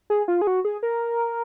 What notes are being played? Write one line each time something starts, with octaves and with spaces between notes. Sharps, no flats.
G#4
F4
G#4
F#4
G#4
A#4